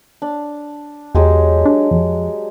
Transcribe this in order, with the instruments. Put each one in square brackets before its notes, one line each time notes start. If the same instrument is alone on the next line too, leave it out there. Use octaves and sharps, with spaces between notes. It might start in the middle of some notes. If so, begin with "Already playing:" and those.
[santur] D4
[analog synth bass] E2 [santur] F#3 G#3 G4
[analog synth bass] D4
F2